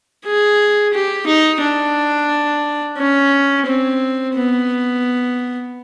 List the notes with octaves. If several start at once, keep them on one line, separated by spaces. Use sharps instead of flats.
G#4
G4
D#4
D4
C#4
C4
B3